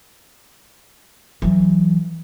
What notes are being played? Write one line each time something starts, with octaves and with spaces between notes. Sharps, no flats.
E3 F#3